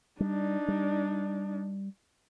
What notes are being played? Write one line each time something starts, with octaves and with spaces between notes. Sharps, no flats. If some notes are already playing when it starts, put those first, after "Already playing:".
G3 D4 D#4
G3